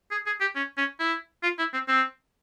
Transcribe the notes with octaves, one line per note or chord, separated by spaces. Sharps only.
G#4
G#4
G4
C#4
C#4
E4
F4
E4
C4
C4